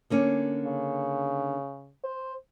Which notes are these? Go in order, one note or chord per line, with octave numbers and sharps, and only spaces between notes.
D3 A#3 C#4
C#3
C5